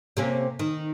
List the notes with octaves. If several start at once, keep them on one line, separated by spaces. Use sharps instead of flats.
C3 A#3 C#4
D#3